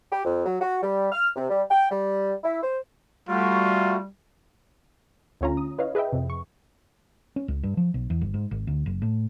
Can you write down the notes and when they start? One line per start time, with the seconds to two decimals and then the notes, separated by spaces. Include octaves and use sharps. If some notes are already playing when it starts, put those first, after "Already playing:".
0.11 G4
0.25 F2
0.45 F#3
0.60 F#4
0.83 G3
1.12 F6
1.35 C3
1.49 G3
1.70 G5
1.91 G3
2.44 E4
2.63 C5
3.29 G3 A3 F4 F#4
5.41 D2 D3 C#4 F4 A#5
5.57 D#6
5.78 E4 B4 C#5 D#5 F5
5.95 G#4 B4 D#5 E5 G5
6.12 F2 C3
6.30 C#6
7.36 C#4
7.48 C#2
7.63 G2
7.77 F3
7.94 B1
8.10 E2
8.21 G1
8.34 G#2
8.51 G#1
8.67 D2
8.86 F#1
9.02 A2